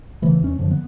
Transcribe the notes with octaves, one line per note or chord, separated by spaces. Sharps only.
C#3 E3 A3
E2 C#4
F#2 D3 F3
B3